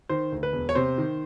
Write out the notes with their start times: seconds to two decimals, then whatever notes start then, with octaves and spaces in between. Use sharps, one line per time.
0.09 D#3 C5
0.32 D2
0.43 B4
0.53 E1
0.69 C#5
0.75 C3 C5
0.98 D#3